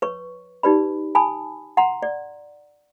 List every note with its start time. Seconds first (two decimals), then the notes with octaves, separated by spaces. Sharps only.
0.02 B4 C#5 C#6
0.63 D#4 G4 B4 D5 B5
1.15 G#5 A5 B5 D#6
1.77 F#5 A#5 C6
2.03 D5